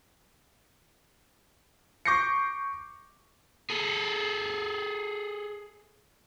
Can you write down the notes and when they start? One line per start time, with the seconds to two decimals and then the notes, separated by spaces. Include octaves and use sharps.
2.05 C#6 D6 G6 A#6 C7 C#7
3.70 G#4 A4